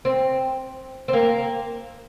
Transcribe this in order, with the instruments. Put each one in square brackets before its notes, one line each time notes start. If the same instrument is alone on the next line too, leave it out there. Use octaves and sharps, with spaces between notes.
[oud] C4
C4
A#3